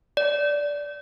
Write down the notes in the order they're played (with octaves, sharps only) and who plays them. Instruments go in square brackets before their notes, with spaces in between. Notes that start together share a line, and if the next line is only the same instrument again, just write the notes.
[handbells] D5